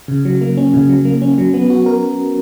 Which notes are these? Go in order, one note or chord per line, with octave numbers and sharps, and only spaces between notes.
C#3
F#3
A#3
C#4
C#3
F#3
A#3
C#4
F#3
B3
F#4
A#4